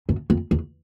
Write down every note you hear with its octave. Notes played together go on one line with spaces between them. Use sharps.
F#2
F2
E2